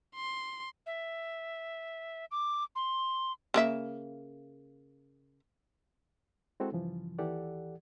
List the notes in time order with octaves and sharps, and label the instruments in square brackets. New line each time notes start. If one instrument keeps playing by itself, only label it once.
[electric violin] C6
[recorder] E5
D6
C6
[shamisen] C#3 A#3 E5
[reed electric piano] G#3 C4 E4 F#4 A4
G2 C#3 E3 F3
D#2 E3 G4 A4 D5 F#5